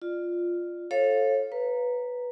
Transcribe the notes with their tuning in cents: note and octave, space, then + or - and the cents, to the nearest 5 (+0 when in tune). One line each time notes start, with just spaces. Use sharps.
F4 +0 D5 +30
A4 +0 C#5 -35 F5 +0
B4 -5 A#5 +0